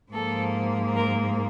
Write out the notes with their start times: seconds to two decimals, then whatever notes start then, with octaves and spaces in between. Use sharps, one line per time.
0.11 G#2 F3 A#3 A4
0.95 A#4